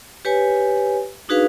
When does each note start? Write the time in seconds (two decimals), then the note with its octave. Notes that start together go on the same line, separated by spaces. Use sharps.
0.25 G4 B4 C#5 G#5
1.29 D4 D#4 F#4 G#4 B4 F5